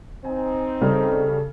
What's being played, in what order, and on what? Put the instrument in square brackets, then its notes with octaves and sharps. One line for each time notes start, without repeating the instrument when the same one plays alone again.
[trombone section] C4 D#4 [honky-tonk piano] G#5
[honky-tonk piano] C#3 G3 F6 [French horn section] A4